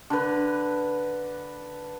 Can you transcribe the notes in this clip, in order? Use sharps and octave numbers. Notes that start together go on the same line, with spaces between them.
D3 B4